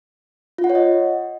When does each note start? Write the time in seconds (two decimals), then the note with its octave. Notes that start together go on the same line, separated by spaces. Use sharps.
0.58 F4
0.64 F#5
0.70 C#5
0.75 D#5